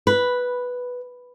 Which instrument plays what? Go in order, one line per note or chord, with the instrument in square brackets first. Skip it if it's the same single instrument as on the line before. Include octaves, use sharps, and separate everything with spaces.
[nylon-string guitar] B4